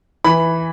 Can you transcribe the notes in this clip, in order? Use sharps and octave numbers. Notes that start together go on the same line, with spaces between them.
E3 B5